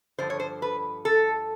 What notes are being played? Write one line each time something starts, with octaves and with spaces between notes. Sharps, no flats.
G2 D3 F3 C5
C#5
C5
B4
A4